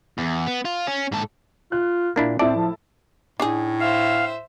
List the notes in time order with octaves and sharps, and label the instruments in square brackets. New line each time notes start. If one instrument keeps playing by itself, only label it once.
[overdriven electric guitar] E2
B3
F4
C#4
G#2 A4
[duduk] F4 [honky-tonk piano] F#6
[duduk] A#2 [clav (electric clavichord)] A#3 D4 E4
[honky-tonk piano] A2 E4 A5 [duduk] C4 [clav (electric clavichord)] D5
[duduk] F3
[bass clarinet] A2 [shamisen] D4 D#4 G#4
[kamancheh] C5 E5 [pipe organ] F5